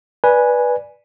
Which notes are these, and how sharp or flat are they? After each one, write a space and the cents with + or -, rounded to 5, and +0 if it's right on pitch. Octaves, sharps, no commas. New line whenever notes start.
B4 -10 D5 +5 G#5 +0